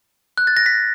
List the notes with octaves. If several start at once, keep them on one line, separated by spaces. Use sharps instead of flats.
F#6
A6
A#6
B6